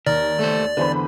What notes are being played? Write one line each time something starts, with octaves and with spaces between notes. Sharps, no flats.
D#2 A#4 D5
A3 A4 C5
E2 D3 B4 C5 B5